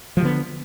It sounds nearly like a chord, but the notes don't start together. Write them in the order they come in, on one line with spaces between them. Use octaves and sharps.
F3 G3 D3 B3